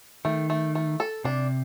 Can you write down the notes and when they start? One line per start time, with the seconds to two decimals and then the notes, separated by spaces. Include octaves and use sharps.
0.25 D#3 A3
0.50 A3
0.75 A3
1.00 A4
1.24 C3 D4